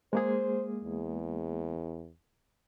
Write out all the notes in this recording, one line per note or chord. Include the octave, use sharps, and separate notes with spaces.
G#3 A#3 G#4 C5
E2